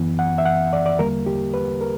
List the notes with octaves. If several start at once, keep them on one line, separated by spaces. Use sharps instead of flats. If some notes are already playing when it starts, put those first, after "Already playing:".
Already playing: F#2 E3 B3
F#5
E5
F#5
D5
D5
E2 D3 G3 A#3 A#4
G4
B4
A#4